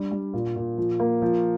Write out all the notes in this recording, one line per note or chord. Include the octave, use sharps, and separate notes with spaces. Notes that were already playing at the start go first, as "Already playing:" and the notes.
Already playing: G3 D4
G3
A#2
A#2
F3
A#3
F3